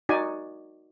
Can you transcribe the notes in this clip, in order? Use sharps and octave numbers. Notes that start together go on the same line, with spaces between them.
D#4 F#4 D5 G#5